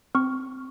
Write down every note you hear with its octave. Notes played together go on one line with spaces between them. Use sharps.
C4 C#6 F6